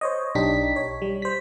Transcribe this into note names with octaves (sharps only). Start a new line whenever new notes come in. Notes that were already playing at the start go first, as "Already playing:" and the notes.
C5 C#5 D#5
B1 D4 D#4 G4 B6
C#5
G3
C5 B6